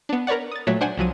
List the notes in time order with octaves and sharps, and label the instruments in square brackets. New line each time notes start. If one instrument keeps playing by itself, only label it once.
[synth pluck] B3 D4
A#4 B4 C#5 D5 F#5
D#6 A6
A#2 F#3 A3 C#5 E5 F#6
D4 C5 F#5 G#5
C2 F3 F#3 D#7